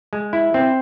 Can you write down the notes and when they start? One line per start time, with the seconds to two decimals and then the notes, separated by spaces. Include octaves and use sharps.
0.13 G#3
0.33 E4
0.54 C4